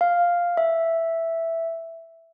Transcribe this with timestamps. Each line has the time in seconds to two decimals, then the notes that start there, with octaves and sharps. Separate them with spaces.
0.01 F5
0.57 E5